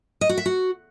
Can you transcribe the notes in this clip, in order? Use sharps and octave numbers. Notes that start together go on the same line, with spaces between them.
D#5
F#4
E5
F#4